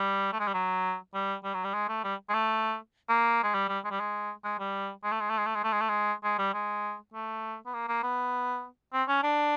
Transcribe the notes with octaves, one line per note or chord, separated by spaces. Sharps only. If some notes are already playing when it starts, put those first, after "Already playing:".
Already playing: G3
A3
G#3
G3
F#3
G3
G3
F#3
G3
G#3
A3
G3
G#3
A3
A#3
G#3
G3
G3
G#3
G3
G#3
G#3
G3
G#3
A3
G#3
A3
G#3
A3
G#3
A3
G#3
A3
G#3
G#3
G3
G#3
A3
B3
A#3
A#3
B3
C4
C#4
D4